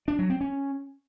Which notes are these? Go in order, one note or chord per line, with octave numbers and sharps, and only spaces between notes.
D4
F#3
C4
C#4